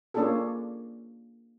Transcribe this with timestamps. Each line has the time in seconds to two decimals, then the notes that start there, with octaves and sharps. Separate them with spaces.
0.14 A#3 C#4 D4 F4 G#4 A4